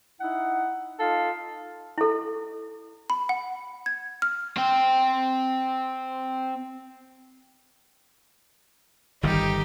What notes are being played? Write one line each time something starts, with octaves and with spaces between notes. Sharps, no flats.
D#4 E4 F#5
D#4 F4 A4 F5
E4 A4
B5
F#5
G#6
F6
C4 G5
G1 D#3 G3 D#4 G4